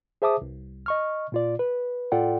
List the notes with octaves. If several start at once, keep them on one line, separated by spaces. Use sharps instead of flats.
G#4 C5 E5 A5 D6 D#6
C2
D#5 C#6 F6
A#2 F4 D5
B4
A2 F4 A4 D5 F#5 G5